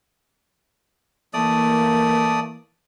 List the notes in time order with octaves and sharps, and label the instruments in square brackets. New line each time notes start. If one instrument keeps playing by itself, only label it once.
[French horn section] E3 A#3 [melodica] A3 D5 D#6